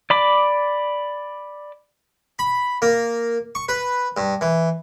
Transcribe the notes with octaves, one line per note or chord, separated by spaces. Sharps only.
D5 B5 D6
B5
A#3
C#6
B4
G2
E3